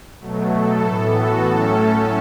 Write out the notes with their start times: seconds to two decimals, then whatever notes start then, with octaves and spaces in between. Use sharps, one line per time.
0.20 B2 F#3 A3
0.52 A4
0.82 A2 E3 B3
1.14 F#4
1.44 A2 F#3 A3 C#4 A4